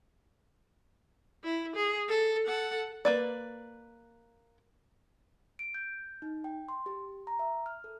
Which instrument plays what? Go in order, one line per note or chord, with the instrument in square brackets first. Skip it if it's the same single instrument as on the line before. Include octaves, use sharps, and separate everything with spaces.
[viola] E4
G#4
A4
A4 F#5
[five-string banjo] A#3 B4 D5
[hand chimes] D7
G6
D#4
G5
C6
G4
A#5
E5
F6
A4